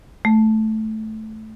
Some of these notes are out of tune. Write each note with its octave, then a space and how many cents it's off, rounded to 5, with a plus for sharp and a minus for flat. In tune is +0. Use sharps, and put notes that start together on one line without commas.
A3 -10